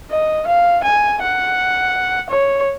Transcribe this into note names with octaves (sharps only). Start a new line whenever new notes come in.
D#5
F5
G#5
F#5
C#5